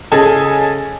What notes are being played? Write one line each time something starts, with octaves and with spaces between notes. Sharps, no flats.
C#3 G#4 A4 D#5 G#5